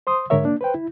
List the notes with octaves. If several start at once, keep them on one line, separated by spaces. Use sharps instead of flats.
C5 C6 D#6
G#2 D3 G#3 A#4 C#5 E5
A#3 D4
B4 C5 G5
E4